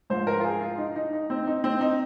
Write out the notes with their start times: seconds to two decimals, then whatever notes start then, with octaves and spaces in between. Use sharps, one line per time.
0.10 G#2 F3 C5
0.27 A#4
0.40 F4
0.45 G#4
0.61 F4
0.78 D#4
0.96 D#4
1.13 D#4
1.30 C4
1.47 D#4
1.64 C4
1.81 D#4